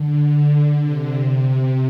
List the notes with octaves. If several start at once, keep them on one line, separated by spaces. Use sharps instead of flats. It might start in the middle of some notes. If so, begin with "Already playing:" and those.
Already playing: D3
D3
C3
C3